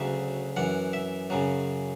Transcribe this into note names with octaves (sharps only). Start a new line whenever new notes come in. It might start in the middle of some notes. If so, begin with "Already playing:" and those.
Already playing: D2 C#3 F#3 E5
F#2 E3 F#5
E5
F#2 C#3 F#3